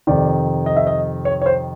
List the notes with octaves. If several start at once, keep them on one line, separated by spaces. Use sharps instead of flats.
F2 C3 D#3 D5
D#5
E5
D#5
C#5
C#5
C5